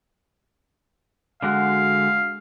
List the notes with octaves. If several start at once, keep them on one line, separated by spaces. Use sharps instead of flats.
D3 G#3 F#4 F5